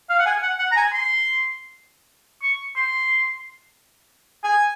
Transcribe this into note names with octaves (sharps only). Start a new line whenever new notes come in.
F5
F#5
G#5
F#5
F#5
A#5
G#5
C6
C#6
C6
G#5